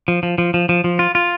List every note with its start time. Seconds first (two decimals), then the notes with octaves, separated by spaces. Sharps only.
0.08 F3
0.23 F3
0.38 F3
0.54 F3
0.69 F3
0.84 F3
0.99 F4
1.15 F4